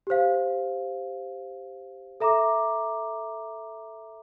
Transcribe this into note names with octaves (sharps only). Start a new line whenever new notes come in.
G4 C5 F5
A4 E5 A#5 D6